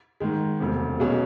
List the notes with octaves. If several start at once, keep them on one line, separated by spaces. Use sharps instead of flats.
G#2 D#3 G#3
E1 D2 C3
B1 B2 G#3 C#4